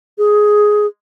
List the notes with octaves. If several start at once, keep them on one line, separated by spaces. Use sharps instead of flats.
G#4